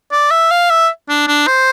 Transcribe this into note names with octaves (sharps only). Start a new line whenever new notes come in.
D5
E5
F5
E5
D4
D4
C5